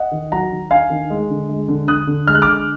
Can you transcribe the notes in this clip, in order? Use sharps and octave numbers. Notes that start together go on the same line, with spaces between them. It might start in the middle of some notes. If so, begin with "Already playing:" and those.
Already playing: D#5 F#5
D#3
F#3 F#5 A#5
D#3
D4 F5 G#5
D#3
G#3
D3
G#3
D3
D3 D#6 F#6
D3
G#3 F6
F#6
D3 D6 F6